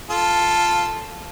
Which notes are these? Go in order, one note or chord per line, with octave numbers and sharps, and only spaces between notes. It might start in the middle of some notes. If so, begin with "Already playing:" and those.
F4 A4